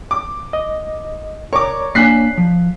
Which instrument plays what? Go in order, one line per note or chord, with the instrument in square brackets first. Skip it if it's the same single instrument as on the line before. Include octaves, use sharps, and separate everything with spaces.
[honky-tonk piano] D6
[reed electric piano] D#5
[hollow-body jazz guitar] A#4 [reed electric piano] C#5 D5 A#5 [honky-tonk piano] C#6 D6
[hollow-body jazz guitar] A#3 D4 G#5 [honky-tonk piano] F#6 B6 C7
[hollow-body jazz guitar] F3